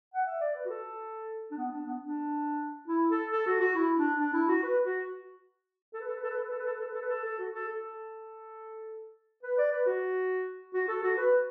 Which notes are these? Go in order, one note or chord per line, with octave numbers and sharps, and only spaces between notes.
F#5
E5
D5
B4
F#4
A4
D4
B3
D4
B3
D4
E4
A4
A4
F#4
F#4
E4
D4
D4
E4
F#4
B4
F#4
A4
B4
A4
B4
A4
B4
A4
B4
A4
B4
A4
B4
A4
B4
A4
B4
A4
A4
F#4
A4
A4
B4
D5
B4
F#4
F#4
A4
F#4
B4